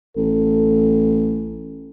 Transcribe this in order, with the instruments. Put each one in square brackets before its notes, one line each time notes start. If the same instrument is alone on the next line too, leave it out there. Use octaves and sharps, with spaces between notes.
[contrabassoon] A1 [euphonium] A4